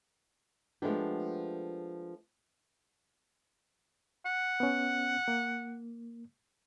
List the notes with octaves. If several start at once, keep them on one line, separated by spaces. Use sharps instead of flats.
F3 G#3 A3 B3 D4 G4
F#5
B3 C#4
A#3